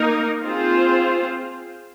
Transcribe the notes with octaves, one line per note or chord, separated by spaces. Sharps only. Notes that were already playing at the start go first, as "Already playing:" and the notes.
Already playing: A#3 D#4 A#4
C4 F4 G#4 C5